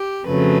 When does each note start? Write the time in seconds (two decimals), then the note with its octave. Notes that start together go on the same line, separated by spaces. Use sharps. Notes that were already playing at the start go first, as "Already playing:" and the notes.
Already playing: G4
0.27 F2 C#3 F#3 A3 B4